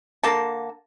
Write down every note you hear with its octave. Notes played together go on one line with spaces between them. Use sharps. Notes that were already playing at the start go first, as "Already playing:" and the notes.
D3 A#3 A5